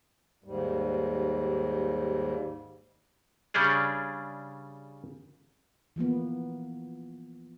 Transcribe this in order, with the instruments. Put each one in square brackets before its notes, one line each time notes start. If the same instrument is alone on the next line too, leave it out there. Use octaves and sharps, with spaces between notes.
[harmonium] D#2 G#2 G3
[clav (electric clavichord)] C#3 G3 C#4 D4 G#4
[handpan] E3 F3 A#3 B3